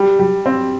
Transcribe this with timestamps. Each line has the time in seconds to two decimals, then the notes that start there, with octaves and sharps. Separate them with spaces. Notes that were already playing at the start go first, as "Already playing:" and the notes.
Already playing: G3
0.19 G3
0.46 C4